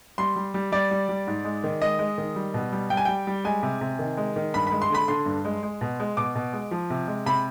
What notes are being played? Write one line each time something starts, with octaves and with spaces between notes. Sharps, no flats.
G3 C6
G3
G3
G3 D5
G3
G3
G#2
G#3
D#3
G#3 D#5
G#3
D#3
G3
B2
G3
G3 G5
G#5
G3 G5
G3
G#3 G#5
C3
C3
D#3
G#3
D#3
G2 B5
G#3 B5
C6
D3 B5
D3 C6
G2
G#3
G#3
B2
G#3
B2 D6
B2
G#3
F3
C3
G#3
C3 B5